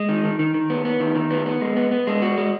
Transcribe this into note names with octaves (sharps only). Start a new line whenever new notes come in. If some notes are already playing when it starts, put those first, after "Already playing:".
Already playing: G#3
D#3
D#3
D#3
D#3
B3
B3
D#3
D#3
B3
B3
G#3
B3
B3
G#3
F#4
G#3